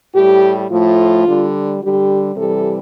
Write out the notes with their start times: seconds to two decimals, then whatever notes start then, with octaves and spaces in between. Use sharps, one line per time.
0.14 A2 G3 G4
0.69 A2 F3 A3 F4
1.26 D3 G3
1.81 D3 G3 G4
2.36 C3 E3 G3 A4